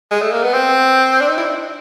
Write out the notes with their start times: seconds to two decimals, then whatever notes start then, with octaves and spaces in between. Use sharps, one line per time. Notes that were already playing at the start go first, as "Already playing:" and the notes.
0.11 G#3
0.22 A3
0.32 A#3
0.43 B3
0.54 C4
1.21 D4
1.28 D#4
1.38 E4
1.46 D4